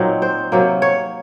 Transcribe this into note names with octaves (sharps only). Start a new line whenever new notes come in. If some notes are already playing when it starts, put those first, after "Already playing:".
Already playing: A#2 F#3 C4 D#4
C5
C3 F#3 A#3
C#5